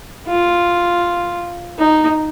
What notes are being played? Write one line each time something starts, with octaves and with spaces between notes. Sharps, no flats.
F4
D#4